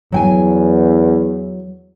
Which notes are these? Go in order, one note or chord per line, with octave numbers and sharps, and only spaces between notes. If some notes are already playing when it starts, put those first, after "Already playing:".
E2 F#3 G5 G#5